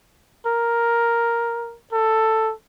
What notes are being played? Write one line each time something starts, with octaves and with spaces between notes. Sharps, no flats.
A#4
A4